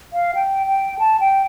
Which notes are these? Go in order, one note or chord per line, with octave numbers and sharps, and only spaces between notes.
F5
G5
G5
A5
G5